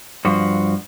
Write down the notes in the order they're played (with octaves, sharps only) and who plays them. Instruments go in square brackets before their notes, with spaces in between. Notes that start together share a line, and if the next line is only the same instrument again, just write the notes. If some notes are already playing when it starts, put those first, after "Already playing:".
[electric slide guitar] G2 F3 F#4